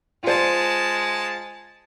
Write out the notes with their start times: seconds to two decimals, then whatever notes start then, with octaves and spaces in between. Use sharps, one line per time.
0.24 G#3 F4 C5 A5